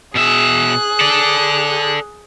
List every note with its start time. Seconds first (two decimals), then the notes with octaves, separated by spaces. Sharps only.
0.15 B2 G#4 E5 F#6
1.01 A4 D5